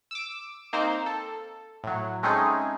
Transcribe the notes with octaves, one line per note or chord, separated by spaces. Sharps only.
D6 E6
A#3 C4 D#4 C5
A4
A2 F#3
G#3 A3 C4 C#4 D#4 G#4